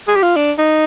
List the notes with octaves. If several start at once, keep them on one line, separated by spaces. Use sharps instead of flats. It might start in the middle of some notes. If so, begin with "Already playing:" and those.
G#4
G4
F4
D4
D#4